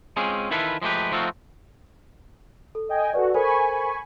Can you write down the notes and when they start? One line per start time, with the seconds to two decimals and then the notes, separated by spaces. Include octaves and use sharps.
0.17 G#3 C4 C#4 F4 G#4
0.51 D#3 E3 E4 F4 A4 B4
0.82 F3 G#3 A3 G4 B4
1.12 F3 A3 C4 D#4 F4 F#4
2.75 A4
2.89 D#5 G5 G#5
3.13 F#4 A4 B4 D5
3.34 A4 A#4 C5 G#5 B5 C#6